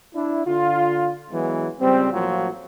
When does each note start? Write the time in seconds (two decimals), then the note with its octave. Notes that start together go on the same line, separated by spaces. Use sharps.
0.14 D4 E4
0.46 D3 F4
1.31 E3 F#3 G#3 B3
1.80 C#2 G3 C4
2.12 A1 F3 F#3 A#3 F4